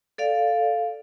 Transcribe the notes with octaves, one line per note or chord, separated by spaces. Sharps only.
A4 D5 F5